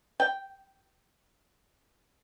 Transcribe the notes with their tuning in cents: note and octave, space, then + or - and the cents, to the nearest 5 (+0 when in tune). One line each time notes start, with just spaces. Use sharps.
G5 -5